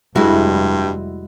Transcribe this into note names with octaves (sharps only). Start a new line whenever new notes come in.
F1 G2 G3 G#3 E4 F#4